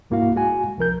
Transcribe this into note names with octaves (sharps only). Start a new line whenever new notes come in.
C2 G#2 A#3 E4 F#4 F5
G#3 F#4 G#5
C2 F3 A#4 G6